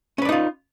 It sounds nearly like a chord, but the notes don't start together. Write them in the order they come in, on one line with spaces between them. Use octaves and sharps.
C#4 B4 D5 D#4 F4